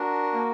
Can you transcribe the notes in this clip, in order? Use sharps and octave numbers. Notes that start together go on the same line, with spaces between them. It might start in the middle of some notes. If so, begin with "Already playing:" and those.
Already playing: D4 F#4 A#4
A#3